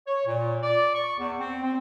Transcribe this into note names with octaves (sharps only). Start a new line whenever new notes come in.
C#5
A#2
D5
C#6
E2
C4
C4